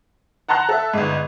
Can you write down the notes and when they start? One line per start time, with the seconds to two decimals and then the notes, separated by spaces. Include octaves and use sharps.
0.49 F#5 A5 A#5 C6 F#6
0.69 A4 E5
0.93 G1 G#2